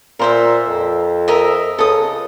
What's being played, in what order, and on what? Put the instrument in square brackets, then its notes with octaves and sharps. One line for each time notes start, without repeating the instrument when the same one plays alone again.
[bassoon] A#2 [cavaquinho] A#4 C5 E5
[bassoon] F2
[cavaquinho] A#4 D#5 E5
[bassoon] C#2 [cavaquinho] A4 D#6